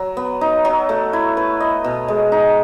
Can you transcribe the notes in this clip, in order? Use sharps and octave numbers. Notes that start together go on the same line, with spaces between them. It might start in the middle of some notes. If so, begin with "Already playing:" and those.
Already playing: F#3
B3
D#4
F#3
A3
E4
B4
D#5
B2
G#3
D#4